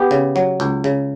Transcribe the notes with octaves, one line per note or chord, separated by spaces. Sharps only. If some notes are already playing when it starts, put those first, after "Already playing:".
Already playing: B3 G4
C#3
F#3
C#2
C#3